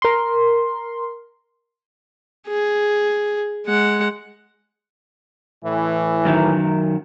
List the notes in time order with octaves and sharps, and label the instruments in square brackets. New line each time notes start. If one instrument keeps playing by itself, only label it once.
[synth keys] A#4 C6
[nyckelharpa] G#4
G#3 F#5
[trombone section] A2 E3
[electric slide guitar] F#2 D#3 F#3